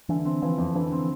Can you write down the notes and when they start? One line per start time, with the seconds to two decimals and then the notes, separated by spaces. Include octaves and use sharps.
0.09 D3 E3
0.25 C4
0.41 E3 F3
0.58 F2
0.75 D3 E3
0.92 C4